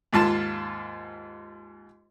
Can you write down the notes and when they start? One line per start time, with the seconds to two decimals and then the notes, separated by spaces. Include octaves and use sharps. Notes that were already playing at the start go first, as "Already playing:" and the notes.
0.13 D#2 G#2 F4 A5